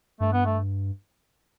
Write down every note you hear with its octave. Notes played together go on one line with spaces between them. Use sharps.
G2 A3
B3
A3